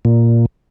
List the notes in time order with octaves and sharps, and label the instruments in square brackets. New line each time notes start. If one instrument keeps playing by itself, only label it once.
[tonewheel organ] A#2